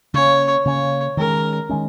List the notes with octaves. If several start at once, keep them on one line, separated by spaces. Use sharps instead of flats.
C#3 A#3 C#4 C#5
C#3 A#3 C#4 C#5
D#3 G#3 C#4 A#4
D#3 G#3 C#4